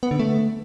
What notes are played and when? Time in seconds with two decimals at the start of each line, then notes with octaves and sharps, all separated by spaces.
0.03 B3
0.11 D3
0.19 A3